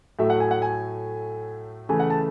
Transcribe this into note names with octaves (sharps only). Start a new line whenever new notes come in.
A2 F#3 A3 E5
F#5
G#5
F#5
G#5
C#3 E3 A3 G#5
F#5
A5